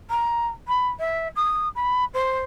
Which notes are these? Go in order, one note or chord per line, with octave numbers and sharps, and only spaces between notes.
A#5
B5
E5
D#6
B5
C5